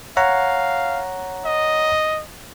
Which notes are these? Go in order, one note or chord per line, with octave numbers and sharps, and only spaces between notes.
C#5 F5 F#5 A#5
D#5